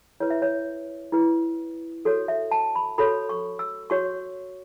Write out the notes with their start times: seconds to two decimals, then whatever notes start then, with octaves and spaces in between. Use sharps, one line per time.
0.20 E4 B4 C#5
0.30 E5
0.42 C#5
1.12 E4 B4
2.05 F#4 A4 C#5
2.28 E5
2.51 A5
2.75 B5
2.98 F#4 A4 C#5 B5
3.29 C#6
3.59 E6
3.90 F#4 C#5 C#6